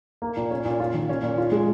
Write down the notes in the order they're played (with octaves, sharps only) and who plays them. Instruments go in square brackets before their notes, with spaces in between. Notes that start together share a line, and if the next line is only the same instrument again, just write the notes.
[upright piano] A#3
A#2
C#4
A#2
F4
D#3
C#4
A#2
F4
G#3